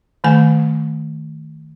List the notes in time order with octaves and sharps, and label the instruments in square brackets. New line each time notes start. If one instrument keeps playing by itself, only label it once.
[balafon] D#3 A3 G#5